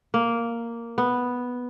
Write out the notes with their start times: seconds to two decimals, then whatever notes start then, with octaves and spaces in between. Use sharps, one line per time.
0.14 A#3
0.98 B3